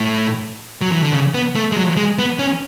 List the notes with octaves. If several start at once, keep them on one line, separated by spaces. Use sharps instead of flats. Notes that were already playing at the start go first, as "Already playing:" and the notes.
Already playing: A2
F#3
E3
D3
C#3
B3
A3
G#3
F#3
G#3
B3
C#4